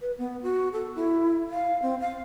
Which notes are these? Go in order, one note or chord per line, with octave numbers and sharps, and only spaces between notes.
B4
B3
F#4
A4
E4
F5
C4
F5